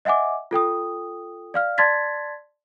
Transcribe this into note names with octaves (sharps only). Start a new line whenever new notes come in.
D#5 E5 F#5 G#5 D6
F4 A4 G5 D#6
D5 F5 F6
D5 A5 C6 G#6 A6 B6